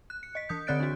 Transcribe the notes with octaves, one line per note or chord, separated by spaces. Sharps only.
F#6
C#7
D#5 B6
E3 D#6 G6
D3 C4 D5 F#6 A6 D7
D4 F#4